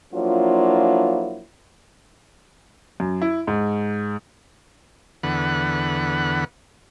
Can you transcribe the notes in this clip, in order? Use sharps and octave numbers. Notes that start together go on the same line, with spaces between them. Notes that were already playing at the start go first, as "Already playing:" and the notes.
F3 F#3 A#3 D4 E4 F4
F#2
E4
G#2
E2 D3 B4 F#5